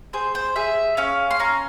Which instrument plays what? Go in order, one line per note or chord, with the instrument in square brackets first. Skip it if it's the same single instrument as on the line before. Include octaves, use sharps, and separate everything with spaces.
[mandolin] G#4 C5
C5
G#4 E5
C#4 F5
C6
C#4 A#5